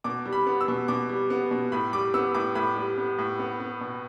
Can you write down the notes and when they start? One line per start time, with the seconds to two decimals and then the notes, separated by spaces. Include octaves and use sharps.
0.04 B2 D6
0.26 G3
0.33 B5
0.47 B3
0.61 E6
0.68 B2
0.88 B2 D6
1.09 G3
1.30 B3
1.51 B2
1.72 A2 B5
1.93 G3 D6
2.14 B3 E6
2.34 A2 D6
2.55 A2 B5
2.76 G3
2.98 B3
3.19 A2
3.39 B3
3.60 B3
3.81 B2